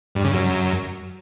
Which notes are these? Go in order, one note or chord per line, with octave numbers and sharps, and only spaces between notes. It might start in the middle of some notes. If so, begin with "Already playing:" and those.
G2
C#3
F#2